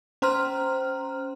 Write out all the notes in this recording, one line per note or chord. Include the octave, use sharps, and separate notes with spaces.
C#4 C5 A#5 C6 F6